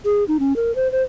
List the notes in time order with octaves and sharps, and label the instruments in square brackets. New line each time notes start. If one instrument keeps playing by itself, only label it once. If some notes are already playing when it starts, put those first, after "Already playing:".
[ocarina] G#4
D#4
C#4
A#4
C5
C5